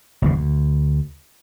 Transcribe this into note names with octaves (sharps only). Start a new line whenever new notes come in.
F#1 D#2 C#3
D2